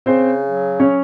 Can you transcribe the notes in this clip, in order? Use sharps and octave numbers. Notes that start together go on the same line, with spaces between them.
C#3 C4 C5
F#3
C#4 C#5